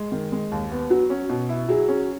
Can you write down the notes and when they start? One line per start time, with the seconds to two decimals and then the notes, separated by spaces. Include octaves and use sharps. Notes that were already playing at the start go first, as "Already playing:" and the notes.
Already playing: G#3
0.12 D#3
0.32 G#3
0.52 D#2
0.72 B3
0.90 F#3 F#4
1.10 C#4
1.29 B2
1.49 E4
1.69 F#3 G#4
1.88 C#4